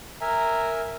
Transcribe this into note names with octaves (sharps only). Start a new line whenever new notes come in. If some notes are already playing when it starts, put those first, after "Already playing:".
A#4 E5 G#5 A#5